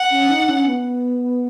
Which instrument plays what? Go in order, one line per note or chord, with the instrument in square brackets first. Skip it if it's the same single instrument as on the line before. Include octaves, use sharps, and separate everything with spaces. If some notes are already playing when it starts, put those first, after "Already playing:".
Already playing: [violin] F#5
[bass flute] C#4
D#4
C#4
B3